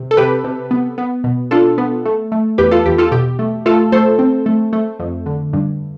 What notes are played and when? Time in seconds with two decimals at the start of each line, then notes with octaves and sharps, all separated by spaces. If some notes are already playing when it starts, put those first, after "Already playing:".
Already playing: C3
0.11 A4
0.17 C3 G4 B4
0.44 C3
0.71 B3
0.98 B3
1.24 B2
1.51 D4 F4 A4
1.78 B3
2.05 A3
2.32 A3
2.58 E2 G4 B4
2.71 F4 A4
2.86 E2 G4
2.98 F4 A4
3.12 B2 G4
3.39 A3
3.66 A3 F4 A4
3.92 A3 A4 C5
4.19 C4
4.46 A3
4.73 A3
4.99 F2
5.26 D3
5.53 G2